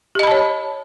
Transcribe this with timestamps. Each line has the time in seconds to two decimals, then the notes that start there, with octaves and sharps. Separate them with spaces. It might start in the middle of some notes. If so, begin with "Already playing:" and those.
0.15 G4
0.19 D#5
0.23 B5
0.27 A5
0.31 C#5